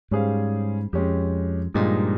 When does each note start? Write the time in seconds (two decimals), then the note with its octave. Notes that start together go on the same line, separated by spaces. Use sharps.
0.11 G#2 G3 C#4 G#4 C5 F5
0.93 F2 G#3 C#4 G4
1.74 G2 A#2 F3 G#3 D#4 G4